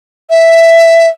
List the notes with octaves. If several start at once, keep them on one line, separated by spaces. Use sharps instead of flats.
E5